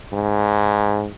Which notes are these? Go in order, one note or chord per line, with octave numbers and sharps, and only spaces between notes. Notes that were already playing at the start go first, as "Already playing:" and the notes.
G#2